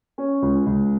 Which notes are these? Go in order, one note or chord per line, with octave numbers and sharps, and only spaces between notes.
C#4
C#2
C#2